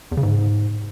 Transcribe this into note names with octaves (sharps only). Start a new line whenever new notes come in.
E2
C#3
G#2